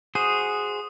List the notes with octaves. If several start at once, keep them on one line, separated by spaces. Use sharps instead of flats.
F#4 G#4 C5 D#6